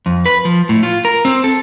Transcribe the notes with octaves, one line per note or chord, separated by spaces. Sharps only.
F2
B4
F3
A2
F4
A#4
C4
A4